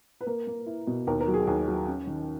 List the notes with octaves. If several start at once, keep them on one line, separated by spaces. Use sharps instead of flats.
B4
A#3 A#4
A#3
E4
B2
D#2 A#4
A#4
F#3
G#4
D#2 G#4
F#3
C#4
D#3